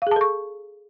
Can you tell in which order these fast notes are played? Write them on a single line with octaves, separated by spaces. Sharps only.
F5 G#4 A5 A4 C#6